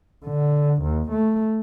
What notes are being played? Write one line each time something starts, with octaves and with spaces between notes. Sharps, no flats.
D3
D#2
A3